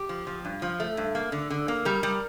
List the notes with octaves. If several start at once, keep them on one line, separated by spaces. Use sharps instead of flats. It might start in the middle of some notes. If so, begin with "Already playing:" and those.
Already playing: G4
F3
F3
G2
F3
A3
G2
A#3
D3
D3
A#3
G3 A#4
G3